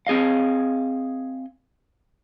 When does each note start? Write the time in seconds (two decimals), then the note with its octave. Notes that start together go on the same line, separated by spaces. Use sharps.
0.07 C4 G#4 D#5 F5